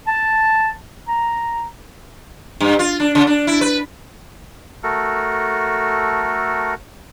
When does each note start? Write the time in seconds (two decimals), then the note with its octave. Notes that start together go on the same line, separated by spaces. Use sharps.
0.07 A5
1.07 A#5
2.61 G2
2.79 F4
3.00 D4
3.15 C#3
3.27 D4
3.47 E4
3.61 B4
4.83 A3 F#4 A4 A#4